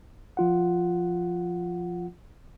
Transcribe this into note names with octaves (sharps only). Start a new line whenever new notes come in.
F3 F4 F#5